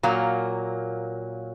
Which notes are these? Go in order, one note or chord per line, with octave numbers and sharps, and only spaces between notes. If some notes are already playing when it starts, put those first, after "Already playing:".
A#2 F#3 A#3